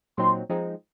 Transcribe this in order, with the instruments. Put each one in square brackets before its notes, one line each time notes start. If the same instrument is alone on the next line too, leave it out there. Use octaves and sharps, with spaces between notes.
[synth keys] A#2 F#3 C4 D#4 [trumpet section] C6
[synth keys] F3 G#3 C4 D#4